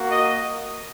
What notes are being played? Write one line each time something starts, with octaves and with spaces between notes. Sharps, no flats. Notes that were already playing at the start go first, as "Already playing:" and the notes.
Already playing: A#3 F#4
D#5